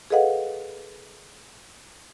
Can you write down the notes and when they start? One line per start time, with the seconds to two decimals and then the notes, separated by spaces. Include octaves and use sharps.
0.10 G#4 A4 B4 D#5 F5 F#5